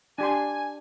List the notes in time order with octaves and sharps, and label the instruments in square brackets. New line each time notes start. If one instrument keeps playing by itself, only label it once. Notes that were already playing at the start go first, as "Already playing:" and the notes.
[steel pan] D4 G4 C6 [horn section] G#5